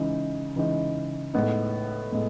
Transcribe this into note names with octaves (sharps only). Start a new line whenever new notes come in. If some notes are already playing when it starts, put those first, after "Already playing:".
Already playing: C#3 E3 G#3 D#4
C#3 E3 G#3 D#4
A2 G#3 B3 D#4
A2 G#3 B3